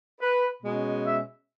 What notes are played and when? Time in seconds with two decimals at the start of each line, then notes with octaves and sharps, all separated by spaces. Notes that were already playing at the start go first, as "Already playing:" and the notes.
0.21 B4
0.63 B2 G#3 C#4
1.05 E5